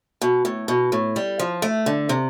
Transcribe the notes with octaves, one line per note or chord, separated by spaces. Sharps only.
B2
A2
B2
A2
G3
F3
A3
D3
C3